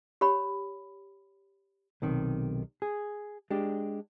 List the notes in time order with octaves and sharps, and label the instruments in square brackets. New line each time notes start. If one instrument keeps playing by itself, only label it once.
[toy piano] G4 C#5 B5
[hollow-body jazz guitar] B1 C3 D#3
G#4
G#3 D4 G4